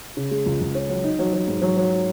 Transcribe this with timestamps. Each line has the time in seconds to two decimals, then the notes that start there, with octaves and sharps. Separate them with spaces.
0.17 C#3
0.31 G#3
0.46 C#2
0.61 C#2
0.75 C#4
0.90 F#3
1.04 D#4
1.19 F#3
1.33 F#3
1.48 G#2
1.62 F#3
1.77 F#3